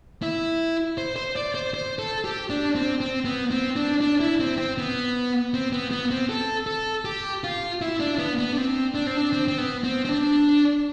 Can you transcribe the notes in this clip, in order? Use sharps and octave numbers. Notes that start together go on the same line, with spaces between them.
E4
C5
C5
D5
C5
C5
A4
G4
D4
C4
C4
B3
C4
D4
D4
E4
C4
C4
B3
C4
B3
B3
C4
A4
A4
G4
F4
E4
D4
B3
B3
D4
C4
D4
C4
D4
C4
C4
B3
C4
C4
D4